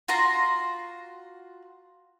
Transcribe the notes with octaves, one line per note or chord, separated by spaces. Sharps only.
F4 F#4 A#5 C6